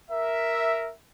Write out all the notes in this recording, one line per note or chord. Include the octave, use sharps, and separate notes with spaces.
A#4 E5